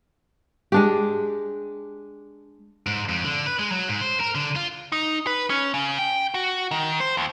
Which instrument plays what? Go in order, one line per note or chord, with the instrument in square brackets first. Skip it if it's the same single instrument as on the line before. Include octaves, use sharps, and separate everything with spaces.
[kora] G#3 D4 G4
[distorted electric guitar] G#2
F2
D3
B4
G#3
F#3
G#2
C5
A#4
D3
F4
[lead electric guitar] D#4
B4
C#4
C#3
G5
F#4
D#3
C5
D#2